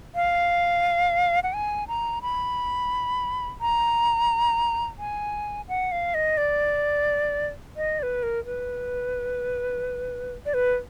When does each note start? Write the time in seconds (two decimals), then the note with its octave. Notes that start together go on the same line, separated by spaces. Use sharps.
0.15 F5
1.43 F#5
1.53 G#5
1.88 A#5
2.22 B5
3.61 A#5
4.99 G#5
5.68 F#5
5.92 F5
6.14 D#5
6.37 D5
7.77 D#5
7.99 D5
8.03 B4
8.23 A#4
8.46 B4
10.46 D5
10.54 B4